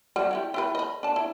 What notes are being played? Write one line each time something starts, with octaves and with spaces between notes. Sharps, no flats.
G3 F#4
E4 F#4 G4
E4 G4 B4
D#5 B5
D4 A5
E4